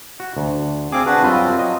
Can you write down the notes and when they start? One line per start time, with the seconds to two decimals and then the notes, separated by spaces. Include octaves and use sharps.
0.20 F#4
0.37 D2
0.92 C4 G#4 F5 G#5 D6
1.06 D4 F#4 B4
1.23 F#2 G3 C4 F4 B4
1.59 F#3 D#5